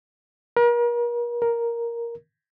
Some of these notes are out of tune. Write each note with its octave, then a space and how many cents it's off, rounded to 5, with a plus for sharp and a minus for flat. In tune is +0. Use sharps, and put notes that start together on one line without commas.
A#4 +40
A#4 +5